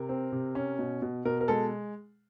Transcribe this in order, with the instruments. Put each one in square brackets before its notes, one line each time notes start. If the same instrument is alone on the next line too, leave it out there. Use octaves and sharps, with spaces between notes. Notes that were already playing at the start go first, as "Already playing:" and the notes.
Already playing: [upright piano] C3 A#4
C4
C3
C#4
B2
B2
B2 A#4
A#4
G#3 A4